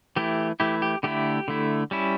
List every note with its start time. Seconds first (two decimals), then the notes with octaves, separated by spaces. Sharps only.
0.16 E3 A3 E4 G4
0.60 E3 A3 E4 G4
0.82 G4
1.03 D3 A3 E4 G4
1.48 D3 A3 E4
1.91 G3 C#4 E4